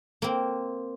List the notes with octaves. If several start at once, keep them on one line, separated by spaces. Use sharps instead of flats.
A#3 C4